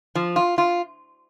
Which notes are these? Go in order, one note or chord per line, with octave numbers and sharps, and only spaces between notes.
F3
F4
F4